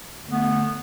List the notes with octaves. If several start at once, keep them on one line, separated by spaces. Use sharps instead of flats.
D3 A3 B3